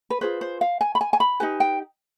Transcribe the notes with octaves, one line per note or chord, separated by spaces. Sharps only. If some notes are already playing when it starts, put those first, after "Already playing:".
B4
F4 G#4 B4 C5
C5
F5
G#5
B5
G#5
G#5
B5
D#4 G4 B4 G#5
G5